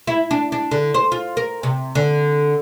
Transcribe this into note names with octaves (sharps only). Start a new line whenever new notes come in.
E4
D4
D4
D3
C5
F4
A#4
C3
D3